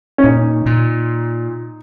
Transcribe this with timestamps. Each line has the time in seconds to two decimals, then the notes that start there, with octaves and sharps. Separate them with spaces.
0.18 C#4
0.23 A#2 D#4
0.66 A#2